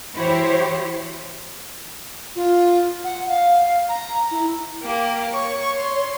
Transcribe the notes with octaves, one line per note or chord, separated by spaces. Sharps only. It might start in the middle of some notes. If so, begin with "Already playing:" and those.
E3 E4 F#4 G4 C5 C#5
F4
F#5
F5
A#5
E4
A#3 G4
C#5 C#6
C6